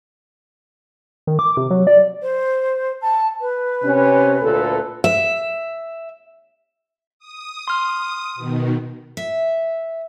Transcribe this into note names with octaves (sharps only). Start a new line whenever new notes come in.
D#3
D6
C3
F#3
D5
C5
A5
B4
C3 C#4
D2 A#2 A4
E5
D#6
C6 F6
B2 D#3
E5